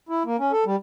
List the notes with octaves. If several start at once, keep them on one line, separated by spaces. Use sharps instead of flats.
E4
A#3
C#4
A4
G3